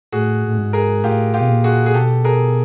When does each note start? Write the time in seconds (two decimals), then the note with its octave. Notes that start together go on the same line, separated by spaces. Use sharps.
0.12 A2 F#4 G#4
0.47 A2
0.58 G#2
0.73 G#4 A#4
1.04 A2 F4 G4
1.34 F4 G4
1.41 B2
1.49 A#2
1.64 F#4 G#4
1.86 G#4
1.94 B2 G4 A4
2.24 G#4 A#4